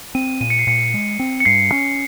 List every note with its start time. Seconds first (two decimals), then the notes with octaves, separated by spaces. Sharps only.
0.15 C4 D#7
0.41 A#2 D#7
0.50 C#7
0.59 C7
0.67 A#2 C#7
0.94 G#3
1.20 C4
1.40 C#7
1.45 G2 C7
1.72 C#4